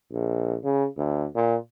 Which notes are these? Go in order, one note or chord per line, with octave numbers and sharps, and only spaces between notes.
A#1
C#3
D2
A#2